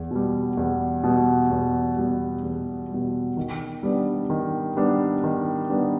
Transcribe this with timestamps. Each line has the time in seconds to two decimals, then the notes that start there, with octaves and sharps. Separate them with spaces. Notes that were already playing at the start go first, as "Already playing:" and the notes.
Already playing: E2
0.11 B2 G3
0.57 E2
1.04 B2 G3
1.51 E2
1.97 B2 G3
2.43 E2
2.90 B2 G3
3.37 D#3
3.83 G3 B3 D4
4.30 D#3
4.76 G3 B3 D4
5.24 D#3
5.70 G3 B3 D4